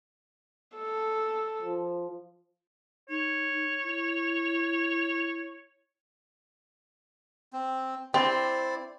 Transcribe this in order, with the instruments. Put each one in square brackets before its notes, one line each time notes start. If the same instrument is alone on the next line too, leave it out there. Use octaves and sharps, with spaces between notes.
[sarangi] A4
[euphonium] F3
[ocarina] D#4 [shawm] C#5
[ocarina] E4
[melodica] C4
[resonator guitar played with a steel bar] C4 [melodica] E4 D5 [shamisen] G4